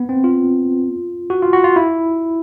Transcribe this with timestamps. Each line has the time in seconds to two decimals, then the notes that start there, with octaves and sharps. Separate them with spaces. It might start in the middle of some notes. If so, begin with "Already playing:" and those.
Already playing: B3
0.09 C4
0.24 F4
1.30 F#4
1.42 F4
1.53 F#4
1.64 F4
1.76 E4